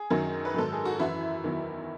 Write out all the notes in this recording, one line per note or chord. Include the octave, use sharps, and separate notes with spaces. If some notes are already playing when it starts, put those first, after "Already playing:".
Already playing: G#4
F#2 D#3 F#3
B4
G#2 D#3 F#3 A4
G#4
F#4
F#2 E3 E4
E2 D#3 F#3